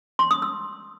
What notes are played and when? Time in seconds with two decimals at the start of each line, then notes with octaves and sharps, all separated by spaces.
0.19 C6
0.31 D#6
0.42 E6